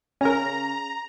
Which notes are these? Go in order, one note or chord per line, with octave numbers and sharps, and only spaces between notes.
C#3 C#4 A#4 A#5